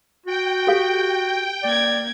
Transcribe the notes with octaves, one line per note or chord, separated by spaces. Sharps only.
F#4 G5
G4 A4 F5
A#3 D5 G#6